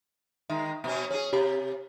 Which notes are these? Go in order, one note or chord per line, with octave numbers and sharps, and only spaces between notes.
D#3 G#3 E5
B2 C#4
C#4 G#4 C#5
C3 G4 C#5 A#5